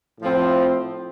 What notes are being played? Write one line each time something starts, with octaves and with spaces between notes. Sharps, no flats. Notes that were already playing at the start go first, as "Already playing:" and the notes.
A2 F3 C4